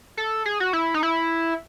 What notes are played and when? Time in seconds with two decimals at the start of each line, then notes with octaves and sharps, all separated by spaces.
0.17 A4
0.45 G#4
0.60 F#4
0.73 E4
0.94 D#4
1.03 E4